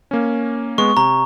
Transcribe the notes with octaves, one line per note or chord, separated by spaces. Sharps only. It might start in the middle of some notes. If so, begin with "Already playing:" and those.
A#3 C#4
G#3 B3 C#6
C3 A#5